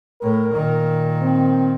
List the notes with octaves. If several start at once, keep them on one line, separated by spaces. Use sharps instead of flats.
A2 A#4
A#2 D#3
C4